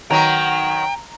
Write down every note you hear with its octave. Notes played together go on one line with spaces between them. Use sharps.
D#3 F#3 B3 G5 A#5